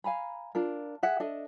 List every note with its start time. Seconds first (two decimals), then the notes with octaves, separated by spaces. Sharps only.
0.04 F5 G#5 A#5 B5
0.55 D4 F4 A#4
1.03 G#4 E5 F#5
1.20 D4 A4 D#5 E5